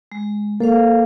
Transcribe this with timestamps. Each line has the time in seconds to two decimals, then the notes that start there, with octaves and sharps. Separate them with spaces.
0.12 G#3
0.60 A#3 A4 C5 F5